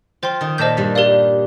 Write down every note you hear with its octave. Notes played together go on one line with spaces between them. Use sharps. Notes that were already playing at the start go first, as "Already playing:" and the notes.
F3 F4 C5 G5 C6
D#3 D#4
A#2 A#3 C5 D#5 A5 D#6 G6
G2 G3
G4 A#4 D5 F5